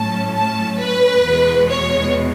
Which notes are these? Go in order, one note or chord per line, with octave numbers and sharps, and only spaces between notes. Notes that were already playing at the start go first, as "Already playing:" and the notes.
Already playing: A2 F#3 C#4 A5
A5
B4
E2 B2 G#3
C#5